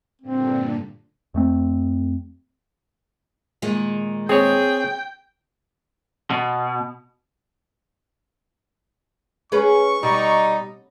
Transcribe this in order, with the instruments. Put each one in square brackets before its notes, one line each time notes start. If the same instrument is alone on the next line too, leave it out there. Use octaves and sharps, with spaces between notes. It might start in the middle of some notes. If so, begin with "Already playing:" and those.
[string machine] G2 A#2 D3 [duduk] C4
[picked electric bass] F2 A3 C4
[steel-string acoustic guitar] A#2 D#3 G#3
[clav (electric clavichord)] C4 C#5 [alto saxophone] G#4 [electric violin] G5
[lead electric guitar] B2
[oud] C#4 G#4 B4 [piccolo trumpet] C#6
[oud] B2 [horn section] G3 D#4